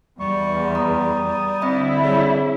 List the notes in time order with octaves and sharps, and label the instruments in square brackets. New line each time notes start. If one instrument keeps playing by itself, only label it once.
[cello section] E2 [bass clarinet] G3 [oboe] C#6
[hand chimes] A#5 B5 [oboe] D#6
[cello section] D3 E4 [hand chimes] C4 D#5 B5
[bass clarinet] G3 [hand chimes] C4 G#4 C#5